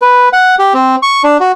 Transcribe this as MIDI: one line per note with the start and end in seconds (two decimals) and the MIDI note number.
0.02 0.29 71
0.33 0.55 78
0.59 0.73 67
0.74 0.96 60
1.03 1.22 85
1.24 1.38 62
1.40 1.52 66